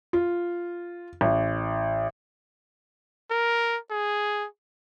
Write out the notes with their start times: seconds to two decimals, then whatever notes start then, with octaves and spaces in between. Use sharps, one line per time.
0.13 F4
1.21 A1
3.31 A#4
3.91 G#4